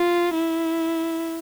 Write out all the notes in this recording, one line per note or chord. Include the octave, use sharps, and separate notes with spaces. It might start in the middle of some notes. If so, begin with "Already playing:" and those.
Already playing: F4
E4